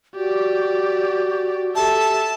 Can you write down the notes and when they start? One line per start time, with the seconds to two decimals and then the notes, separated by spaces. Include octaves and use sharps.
0.16 F#4 G4 D5
1.76 G4 A4 E5 A5